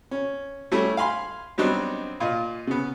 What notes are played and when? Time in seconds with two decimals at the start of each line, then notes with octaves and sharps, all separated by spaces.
0.11 C#4
0.72 G3 A3 C#4 E4
0.97 F5 G#5 B5 C6
1.58 F#3 G3 B3 C4 D4 D#4
2.20 A#2 F4 D#5
2.67 C#3 B3